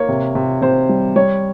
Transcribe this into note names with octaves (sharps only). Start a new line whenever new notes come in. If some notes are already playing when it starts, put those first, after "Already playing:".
Already playing: A#3 C#5
C3
C3
C3 C5
G3
G3 C#5